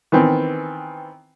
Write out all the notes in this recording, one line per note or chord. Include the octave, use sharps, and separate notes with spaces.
D#3 E3 B3 C4